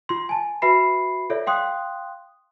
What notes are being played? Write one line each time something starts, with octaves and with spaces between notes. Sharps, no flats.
F4 C6
G#5 A5
F#4 B4 E5 B5 C7
F4 A4 C#5 D5 E5
F5 G5 C6 D#6 F#6